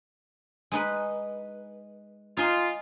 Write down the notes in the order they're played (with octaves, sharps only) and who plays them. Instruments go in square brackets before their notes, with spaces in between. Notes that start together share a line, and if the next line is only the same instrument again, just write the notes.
[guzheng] G#3 D#4 B4
[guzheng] D#4 G#5 [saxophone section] F4